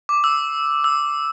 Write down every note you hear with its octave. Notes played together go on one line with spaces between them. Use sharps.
D6
E6
E6